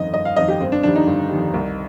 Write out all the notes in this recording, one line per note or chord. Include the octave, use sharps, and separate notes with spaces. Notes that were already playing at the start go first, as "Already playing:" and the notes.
Already playing: G1 F2 D#3 D#5
G1 D#5
F5
F2 D#3 D#5
G4
G1 C4
D4
F2 D#3 G3 D4
D#4
G1
F2 D#3 G3
C2